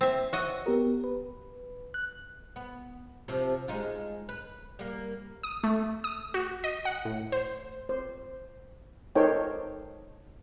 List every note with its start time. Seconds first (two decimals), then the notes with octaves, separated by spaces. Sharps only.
0.01 C4 E5
0.33 F#4 C#5 D#5 E5
0.66 B3 G4 A#4
1.04 B4
1.94 F#6
2.56 B3
3.28 C3 F3
3.68 G#3 D#4 F4
4.29 B4
4.79 G3 A#3
5.43 D#6
5.64 A3
6.04 D#6
6.34 F#4
6.64 D#5
6.85 F#5
7.05 A2
7.32 C5
7.89 C5
9.15 D#4 A4 A#4 C5 C#5 G5